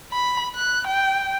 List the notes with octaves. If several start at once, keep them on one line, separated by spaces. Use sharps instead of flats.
B5
F#6
G5